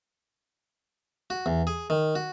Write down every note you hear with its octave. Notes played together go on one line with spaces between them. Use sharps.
F#4
E2
G#4
D#3
F#4